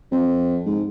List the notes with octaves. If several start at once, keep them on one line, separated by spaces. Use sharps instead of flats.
F2
G#2